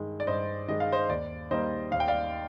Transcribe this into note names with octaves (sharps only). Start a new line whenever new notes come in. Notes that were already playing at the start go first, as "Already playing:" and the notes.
Already playing: G2 D#3 G#3
D5
G2 C5 D#5
D#3 G#3 D#5
F5
C5 D#5
D#2 D5
D#3 G3 A#3 C5 D#5
D#2 F5
G5
D5 F5